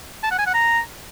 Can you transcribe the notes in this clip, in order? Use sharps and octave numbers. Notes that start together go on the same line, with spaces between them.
A5
F#5
G#5
F#5
A#5